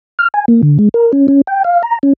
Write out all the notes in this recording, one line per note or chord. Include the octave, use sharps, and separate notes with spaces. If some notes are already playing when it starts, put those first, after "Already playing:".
F6
G#5
A#3
D3
G#3
A#4
C#4
C#4
G5
F5
A#5
C#4